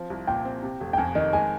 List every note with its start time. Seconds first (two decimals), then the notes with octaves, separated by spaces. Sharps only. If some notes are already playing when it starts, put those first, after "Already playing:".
Already playing: F3 C4
0.10 C2
0.27 A#2 G5
0.45 C4
0.63 C3
0.80 F1
0.93 G5
0.97 F2 G#5
1.15 D#3 D#5
1.33 G#3 G#5